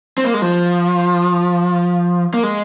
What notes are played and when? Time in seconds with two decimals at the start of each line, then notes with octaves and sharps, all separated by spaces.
0.18 C4
0.25 A#3
0.34 G#3
0.42 F3
2.34 A#3
2.43 G#3